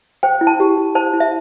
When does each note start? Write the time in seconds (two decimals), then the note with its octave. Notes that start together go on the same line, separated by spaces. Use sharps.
0.23 C5 G5
0.41 E4
0.47 A5
0.60 G4
0.78 E4
0.95 C5 A5
1.13 E4
1.20 E5